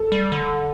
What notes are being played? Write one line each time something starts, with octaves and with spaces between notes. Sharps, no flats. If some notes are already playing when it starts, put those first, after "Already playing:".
Already playing: A4
G3
D3